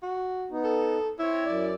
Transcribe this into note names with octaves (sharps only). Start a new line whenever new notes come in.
F#4
B3 D#4
A4
C4 E4 C#5
F#2 D5